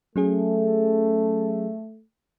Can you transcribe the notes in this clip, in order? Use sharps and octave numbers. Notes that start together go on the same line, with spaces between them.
F#3 A3 C#4 G#4